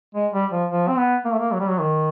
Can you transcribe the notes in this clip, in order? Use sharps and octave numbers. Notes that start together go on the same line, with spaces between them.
G#3
G3
F3
F3
C4
B3
A#3
A3
A#3
F#3
G3
F#3
D#3